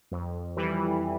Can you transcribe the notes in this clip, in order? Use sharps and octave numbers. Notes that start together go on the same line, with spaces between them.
F2
E3 G3